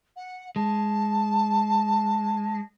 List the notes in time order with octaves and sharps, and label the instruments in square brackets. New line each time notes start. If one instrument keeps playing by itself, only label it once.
[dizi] F#5
[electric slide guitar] G#3 [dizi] A5